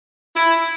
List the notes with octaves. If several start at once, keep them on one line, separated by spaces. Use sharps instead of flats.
E4